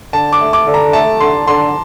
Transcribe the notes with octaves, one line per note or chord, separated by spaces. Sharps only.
D3 A5
D6
A3
D6
D3
A#5
A3 A5
D3 C6
D3 C6